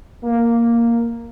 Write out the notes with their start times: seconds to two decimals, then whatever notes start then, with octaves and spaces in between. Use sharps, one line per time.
0.24 A#3